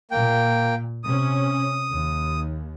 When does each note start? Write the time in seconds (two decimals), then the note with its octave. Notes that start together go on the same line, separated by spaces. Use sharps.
0.11 A#2 A#3 G5
1.04 C3 C#4 D#6
1.89 D#2